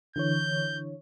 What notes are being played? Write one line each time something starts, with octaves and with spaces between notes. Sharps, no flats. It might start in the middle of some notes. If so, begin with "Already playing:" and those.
D3 E3 C#5 G6